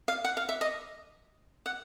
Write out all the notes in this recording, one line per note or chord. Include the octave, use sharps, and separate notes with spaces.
F5
F#5
F5
E5
D#5
F#5